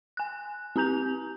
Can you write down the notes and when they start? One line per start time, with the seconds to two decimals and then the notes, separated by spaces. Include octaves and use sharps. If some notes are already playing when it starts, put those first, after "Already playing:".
0.17 G#5 F#6
0.76 C4 G4 A#5 G6 F7